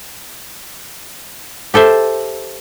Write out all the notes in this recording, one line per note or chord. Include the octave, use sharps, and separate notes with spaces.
G4 A4 C5 E5